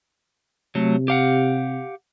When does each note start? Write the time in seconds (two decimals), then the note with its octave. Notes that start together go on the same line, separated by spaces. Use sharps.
0.75 C3 F#3 A3
1.08 G4 F5 F#5